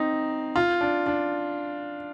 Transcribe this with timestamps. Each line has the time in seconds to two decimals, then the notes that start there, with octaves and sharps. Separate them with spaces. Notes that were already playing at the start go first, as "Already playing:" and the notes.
Already playing: C4 D#4
0.56 F4
0.81 D4
1.06 D4